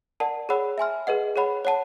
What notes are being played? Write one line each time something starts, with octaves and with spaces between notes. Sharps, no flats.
A#4 D5 F#5 A5
G#4 C#5 F#5 B5 E6
E5 G#5 C6 F6
G#4 B4 D#5 F#5
G#4 C#5 F#5 B5
C#5 F#5 A5